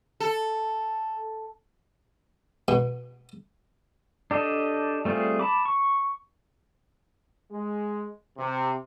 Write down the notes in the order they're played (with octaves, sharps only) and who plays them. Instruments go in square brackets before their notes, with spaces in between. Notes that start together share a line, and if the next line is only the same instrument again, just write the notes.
[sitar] A4
[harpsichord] B2
[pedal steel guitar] D4 G4 A4 D#5
G3 A3 C4 F4 G#4
A5 B5 D6
C#6
[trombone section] G#3
C3